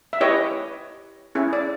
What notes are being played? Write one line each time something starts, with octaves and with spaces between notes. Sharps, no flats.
E5
E4 G4 B4 C#5 D#5
C#4 E4 G#4
D5